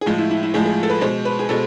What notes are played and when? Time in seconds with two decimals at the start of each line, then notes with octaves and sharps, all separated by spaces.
0.01 G#4
0.06 A2 F3 G#3 F4
0.18 E4
0.31 E4
0.43 E4
0.54 A2 F3 G#3 G#4
0.66 G#4
0.83 A4
0.89 B4
1.01 B2 G#3 C5
1.25 B4
1.39 G#4
1.49 B2 G#3 A4